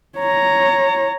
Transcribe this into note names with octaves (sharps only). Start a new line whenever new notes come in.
C#5 A#5